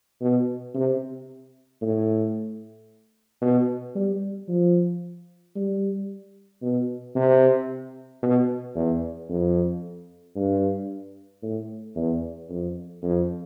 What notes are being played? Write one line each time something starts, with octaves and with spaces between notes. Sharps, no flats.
B2
C3
A2
B2
G3
F3
G3
B2
C3
B2
E2
F2
G2
A2
E2
F2
F2